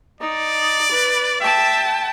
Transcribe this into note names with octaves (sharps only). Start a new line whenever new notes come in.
D#4 D5
B4
E5 G5 A5